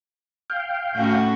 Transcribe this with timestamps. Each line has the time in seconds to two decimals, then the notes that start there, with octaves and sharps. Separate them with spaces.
0.50 F5 G5
0.94 A2 C#4 F#4